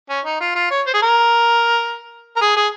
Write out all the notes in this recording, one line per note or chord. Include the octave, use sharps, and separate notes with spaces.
C#4
D#4
F4
F4
C#5
C5
G#4
A#4
A#4
G#4
G#4